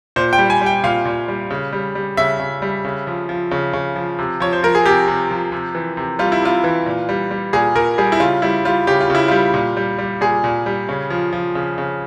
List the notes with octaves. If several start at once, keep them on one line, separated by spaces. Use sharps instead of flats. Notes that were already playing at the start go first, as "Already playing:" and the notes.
A#2 C5
G5
G3
G#5
G3 G5
A#2 F5
A#2
G3
C#3
G3
G3
C#3 E5
C#3
G3
C#3
F3
F3
C#3
C#3
F3
C3
F3 C#5
C5
F3 A#4
G#4
C3 G4
C3
F3
C3
E3
C3
G3 F4
E4
C3 F4
E3
A#2
G3
G3
A#2 G#4
A#2 A#4
G3 G#4
E4
C#3 F4
G3 E4
G3 F4
C#3 G4
F4
C#3 E4
G3 F4
A#2
G3
G3
A#2 G#4
A#2
G3
C#3
F3
F3
C#3
C#3